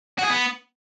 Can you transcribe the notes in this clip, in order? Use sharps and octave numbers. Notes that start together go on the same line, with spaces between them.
F#4
G#4
B3